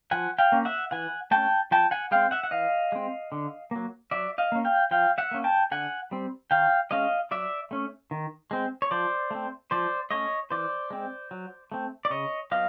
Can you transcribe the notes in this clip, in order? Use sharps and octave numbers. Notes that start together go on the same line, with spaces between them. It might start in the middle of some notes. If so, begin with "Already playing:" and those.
F3 F#5 G#5
F5 G5
A#3 C#4
E5 F#5
E3 F#5 G#5
A3 C#4 G5 A5
F3 G5 A5
F#5 G#5
G#3 C4 F5 G5
E5 F#5
F#5
E3 D#5 F5
G#3 C4
D3
F#3 A#3
F#3 D5 E5
D#5 F5
A#3 C#4
F5 G5
F3 F5 G5
E5 F#5
A#3 C#4
G5 A5
D3 F#5 G#5
G3 C4
D#3 F5 G5
G#3 C#4 D#5 F5
F#3 D5 E5
A3 C#4
D#3
G#3 C4
C#5
F3 C5 D5
A3 C4
F3 C5 D5
A3 C#4 C#5 D#5
E3 C5 D5
G#3 C4
F#3
A3 C4
D5
C#3 C#5 D#5
F#3 B3 D#5 F5